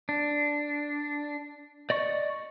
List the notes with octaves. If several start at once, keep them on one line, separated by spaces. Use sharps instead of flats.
D4
D5 D#5 C#6